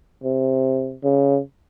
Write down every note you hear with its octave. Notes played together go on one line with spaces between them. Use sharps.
C3
C#3